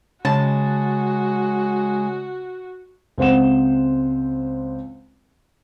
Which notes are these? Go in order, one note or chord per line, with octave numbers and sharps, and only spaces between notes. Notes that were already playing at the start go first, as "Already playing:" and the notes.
C#3 G#3 F#4 A5
C#2 C4 C5 F#5 E7